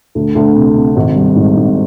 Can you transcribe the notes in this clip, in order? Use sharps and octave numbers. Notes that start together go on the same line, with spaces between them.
D2
D2
C3
C3
G#1
G3
G#2
G#2